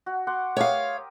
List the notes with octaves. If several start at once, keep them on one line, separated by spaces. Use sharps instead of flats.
F#4
F#5 C6 D6
G4 A#4 C#5 F5 D#6